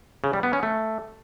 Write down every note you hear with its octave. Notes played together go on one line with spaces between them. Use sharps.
C#3
G3
B3
C#4
A3